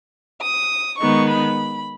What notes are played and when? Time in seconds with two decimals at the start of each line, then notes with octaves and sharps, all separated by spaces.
0.42 D#6
0.99 D#3 G#3 B3 D#4 C#6
1.29 B5